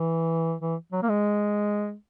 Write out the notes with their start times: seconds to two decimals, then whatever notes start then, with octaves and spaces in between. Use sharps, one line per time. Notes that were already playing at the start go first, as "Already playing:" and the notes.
Already playing: E3
0.61 E3
0.92 F#3
1.02 A#3
1.09 G#3